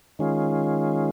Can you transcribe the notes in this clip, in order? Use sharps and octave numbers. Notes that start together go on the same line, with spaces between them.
D#3 G#3 C#4 F4